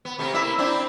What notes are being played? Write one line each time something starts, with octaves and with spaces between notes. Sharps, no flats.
B3
C3 A3 B3
A#3 E4 E5
C4 D4 E4